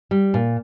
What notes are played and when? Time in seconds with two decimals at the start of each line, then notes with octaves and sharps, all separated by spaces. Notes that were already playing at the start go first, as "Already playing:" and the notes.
0.11 G3
0.34 A#2